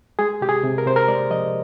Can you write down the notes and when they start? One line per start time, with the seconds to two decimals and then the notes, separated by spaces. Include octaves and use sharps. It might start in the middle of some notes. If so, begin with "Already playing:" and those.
0.19 G#3 G#4
0.41 C3 G4
0.49 G#4
0.63 C3
0.78 A#4
0.86 C3 C5
0.96 A#4
1.08 G#3 D5
1.30 F3 D#5